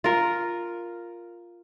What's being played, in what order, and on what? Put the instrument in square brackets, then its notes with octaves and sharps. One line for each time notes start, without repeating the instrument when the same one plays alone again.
[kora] F4 A#4